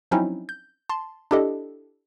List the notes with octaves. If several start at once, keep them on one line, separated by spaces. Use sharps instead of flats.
F3 F#3 C4 C#4 D#4 E4
G6
A5 C6
D4 E4 G4 A4 D#5